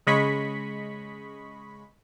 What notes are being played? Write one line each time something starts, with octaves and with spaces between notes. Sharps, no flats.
C#3 G#3 D#5 B5 C#6 B6